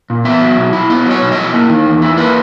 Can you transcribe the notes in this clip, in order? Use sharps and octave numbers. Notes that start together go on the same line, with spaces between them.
A#2
B3 E5
F#3
B2
E4
B3 D#5
F#3 C#5
B2
D#5
E4
A#3
D#3
E2
E4
A#3 B4